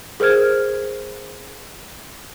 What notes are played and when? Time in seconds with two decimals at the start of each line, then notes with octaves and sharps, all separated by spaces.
0.20 G#4 A#4 C5 F6 G#6